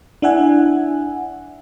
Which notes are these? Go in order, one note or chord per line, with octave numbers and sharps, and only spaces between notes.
D4 E4 E5 F#5 G#5